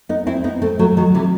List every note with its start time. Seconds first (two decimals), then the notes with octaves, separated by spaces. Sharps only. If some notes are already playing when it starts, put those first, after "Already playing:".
0.09 B3 D#4
0.27 C4 E4
0.44 B3 D#4
0.62 A3 C4
0.79 F#3 A3
0.97 D#3 F#3
1.14 C3 E3